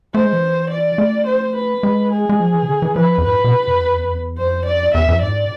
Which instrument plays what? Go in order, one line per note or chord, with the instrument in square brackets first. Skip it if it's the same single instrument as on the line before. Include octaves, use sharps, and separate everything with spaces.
[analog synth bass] A3 [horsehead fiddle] C5
[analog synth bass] G#3
E3
[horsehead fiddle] D5
[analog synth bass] A3
[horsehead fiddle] C5
B4
[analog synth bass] G#3
[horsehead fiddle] G#4
[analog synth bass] G#3
F3
E3
C3
D3
E3
[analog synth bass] F3 [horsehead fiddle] B4
[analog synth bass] F2
[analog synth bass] G#2 [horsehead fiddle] B4
[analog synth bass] A2
B2
C3
F2
E2
F2
E2
F2
E2
[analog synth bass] F2 [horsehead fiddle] C5
[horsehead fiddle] D5
[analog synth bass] E2 [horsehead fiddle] E5
[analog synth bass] F2
[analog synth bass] G#2 [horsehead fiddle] D5